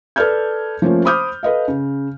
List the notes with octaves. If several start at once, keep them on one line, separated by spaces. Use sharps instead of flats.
A4 B4 D5 F6 G6 G#6
F3 A3 A#3 C#4 F4
C5 B5 D6 D#6 F6 G6
A4 B4 D#5 F5
C#3